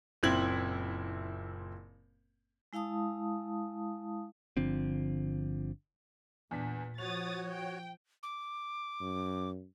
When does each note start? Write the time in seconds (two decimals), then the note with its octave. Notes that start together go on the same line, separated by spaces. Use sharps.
0.23 F#1 A#2 C4 E4 G#6 F#7
2.73 G#3 E4 F5 A5 D#6
4.57 G1 D3 F3 C4
6.51 E2 A#2 D4 B6
6.98 F3 F#4 C#5 D#6 A6 F7
7.49 G5
8.23 D6
9.01 F#2